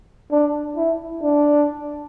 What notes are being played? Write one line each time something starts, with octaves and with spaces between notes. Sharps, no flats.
D4
E4
D4